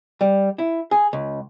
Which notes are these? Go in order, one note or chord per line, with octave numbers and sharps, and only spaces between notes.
G3
E4
G#4
C#2